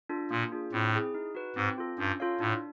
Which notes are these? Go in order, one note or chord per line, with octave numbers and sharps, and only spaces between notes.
D4 F4 A4
A#2 A#3
D4 F4 G#4
A2 C4
E4 G#4
D#4
F#4 B4
G#2 C4
F4 A4
G2 C#4
F4 A4 C#5 F5
A2 D4